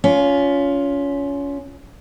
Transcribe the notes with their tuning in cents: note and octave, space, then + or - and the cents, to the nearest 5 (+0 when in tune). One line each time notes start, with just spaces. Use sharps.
C#4 +25 F4 +5